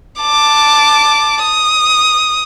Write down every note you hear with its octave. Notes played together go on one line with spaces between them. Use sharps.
A5 D6
D#6